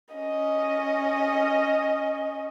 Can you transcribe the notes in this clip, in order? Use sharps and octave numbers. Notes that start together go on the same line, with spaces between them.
C#4 D#5